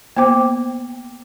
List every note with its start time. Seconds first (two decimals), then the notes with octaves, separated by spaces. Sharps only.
0.17 A#3 B3 C5 G5 D6